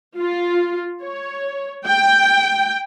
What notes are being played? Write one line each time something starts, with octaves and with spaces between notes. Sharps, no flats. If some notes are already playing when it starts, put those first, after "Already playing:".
F4
C#5
G5